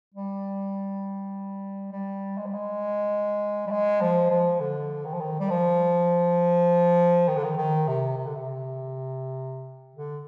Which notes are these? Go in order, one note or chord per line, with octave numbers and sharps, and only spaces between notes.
G3
G3
G#3
G3
G#3
G3
G#3
F3
F3
D3
D#3
F3
D#3
G3
F3
D#3
D3
D#3
D#3
C3
C3
D3
C3
D3